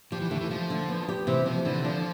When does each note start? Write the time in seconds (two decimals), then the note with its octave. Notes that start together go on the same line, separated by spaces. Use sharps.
0.12 F3 G4
0.21 E3
0.31 D3 A3
0.41 E3
0.51 F3 A3
0.70 D3
0.89 B3
1.09 G4
1.27 C3 E3
1.46 C3 F3
1.65 D3 E3
1.84 F3 D4